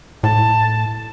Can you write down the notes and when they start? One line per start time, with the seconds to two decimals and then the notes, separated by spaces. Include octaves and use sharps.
0.24 A2 A5